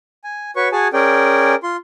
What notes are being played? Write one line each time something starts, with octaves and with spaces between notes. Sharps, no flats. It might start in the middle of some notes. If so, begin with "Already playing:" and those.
G#5
F#4 B4 C#5 C#6
F#4 G#4 G#5 A5
C#4 G#4 A#4 D5 G5
F4 C6